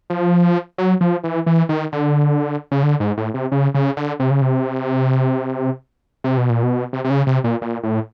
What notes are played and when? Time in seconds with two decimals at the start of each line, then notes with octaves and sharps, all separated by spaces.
0.10 F3
0.78 F#3
1.01 F3
1.24 E3
1.46 E3
1.69 D#3
1.92 D3
2.71 C#3
2.83 D3
3.00 G#2
3.17 A2
3.34 C3
3.52 C#3
3.74 C#3
3.97 D3
4.20 C3
4.31 C#3
4.41 C3
6.24 C3
6.37 B2
6.50 A#2
6.63 B2
6.93 C3
7.04 C3
7.10 C#3
7.27 C3
7.44 A#2
7.62 A#2
7.83 A2